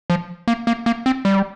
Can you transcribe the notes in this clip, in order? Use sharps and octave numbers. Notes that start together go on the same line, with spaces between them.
F3
A#3
A#3
A#3
C4
G3